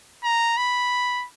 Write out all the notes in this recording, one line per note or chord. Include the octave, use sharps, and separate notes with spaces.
A#5
B5